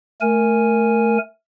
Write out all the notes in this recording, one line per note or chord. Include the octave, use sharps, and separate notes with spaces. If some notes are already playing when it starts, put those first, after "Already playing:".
A3 A#4 G#5